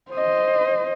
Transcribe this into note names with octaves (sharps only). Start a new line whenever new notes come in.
C5 D#5